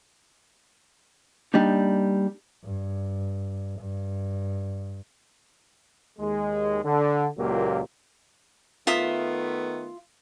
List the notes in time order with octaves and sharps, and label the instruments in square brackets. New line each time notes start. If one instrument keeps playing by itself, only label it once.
[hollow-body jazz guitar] G3 A#3 D4 D#4
[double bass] G2
G2
[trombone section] D#2 G#3
D3
C#2 A#2 F#3 A#3 G4
[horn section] D#3 A3 B3 [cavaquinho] F4 E5 D#6